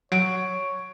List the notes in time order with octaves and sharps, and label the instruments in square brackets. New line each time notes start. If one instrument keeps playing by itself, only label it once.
[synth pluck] F#3 [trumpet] C#5 [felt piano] D7